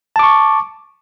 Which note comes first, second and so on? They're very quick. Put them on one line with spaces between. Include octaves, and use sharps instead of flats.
A5 D6 C#6